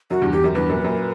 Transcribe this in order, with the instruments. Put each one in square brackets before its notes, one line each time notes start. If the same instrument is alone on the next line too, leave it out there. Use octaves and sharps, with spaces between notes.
[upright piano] F#2 [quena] F#4
[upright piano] E2 G2
[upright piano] E2 [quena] G4
[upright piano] F#2
[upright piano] E2 G2 [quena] B4
[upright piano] F#2 A#2
F#2 A#2